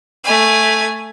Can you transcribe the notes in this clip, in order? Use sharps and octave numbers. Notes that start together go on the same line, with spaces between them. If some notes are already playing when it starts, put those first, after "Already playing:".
A3 G#5